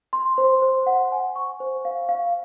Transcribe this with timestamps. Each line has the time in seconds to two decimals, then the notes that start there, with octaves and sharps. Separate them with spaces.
0.13 C6
0.38 C5
0.62 C5
0.87 F#5
1.12 G#5
1.36 C#6
1.60 C5
1.85 F5
2.09 F5